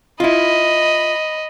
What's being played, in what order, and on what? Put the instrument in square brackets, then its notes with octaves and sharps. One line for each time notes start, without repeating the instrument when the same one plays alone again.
[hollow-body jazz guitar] E4 F4 [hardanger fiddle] D#5 B5